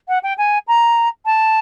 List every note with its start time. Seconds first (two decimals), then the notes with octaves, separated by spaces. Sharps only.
0.08 F#5
0.23 G5
0.38 G#5
0.67 A#5
1.25 A5